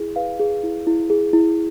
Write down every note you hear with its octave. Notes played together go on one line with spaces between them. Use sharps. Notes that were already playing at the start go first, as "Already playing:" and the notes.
Already playing: E4 G#4
B4 F5
G#4
E4
E4
G#4
E4